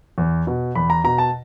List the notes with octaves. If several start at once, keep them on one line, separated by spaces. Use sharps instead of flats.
E2
B2
E2 B5
A#5
B2 A#5
A5